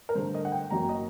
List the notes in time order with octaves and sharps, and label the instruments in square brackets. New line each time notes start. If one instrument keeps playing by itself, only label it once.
[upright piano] A#4
G2 D3 A3 C5
D#5
F#5
G5
F#1 F#2 F#3 A#5
D#5